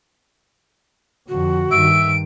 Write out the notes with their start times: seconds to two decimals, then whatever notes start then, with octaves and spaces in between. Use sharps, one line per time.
1.28 F2 D3 F#4
1.72 G2 D#3 E5 D7